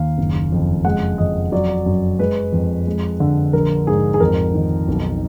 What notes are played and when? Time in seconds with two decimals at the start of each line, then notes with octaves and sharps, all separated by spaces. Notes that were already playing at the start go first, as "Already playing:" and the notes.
Already playing: D#2 F5
0.18 F#1
0.52 F2
0.85 G#3 F#5
1.18 F2 D#5
1.52 F#3 D5
1.86 F#2
2.19 G#3 B4
2.53 F2
2.87 G#3
3.20 D3
3.53 A#1 A#4
3.87 G#2 G#4
4.14 G#4
4.20 F2 A#4
4.54 D#3
4.88 B1